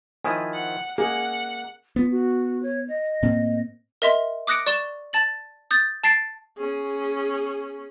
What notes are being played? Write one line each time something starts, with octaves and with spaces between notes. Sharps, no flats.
D#3 F3 E4 G#5 D#6
F#5
A#3 G#4 F#5
B3 F4
F#4
C#5
D#5
A2 A#3 C4
A#4 D#5 E5 C6
D6 D#6 F#6 A#6 C#7 D7
D5 C#6 E7 G7
A5 A6 F#7
D#6 G6 A6
A5 A6 C7 D7
C#4 G#4